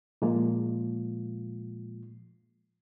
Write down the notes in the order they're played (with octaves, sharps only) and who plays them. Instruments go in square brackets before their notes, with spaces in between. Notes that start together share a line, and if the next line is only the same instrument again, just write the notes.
[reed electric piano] A#2 F3 G#3 A#3 F4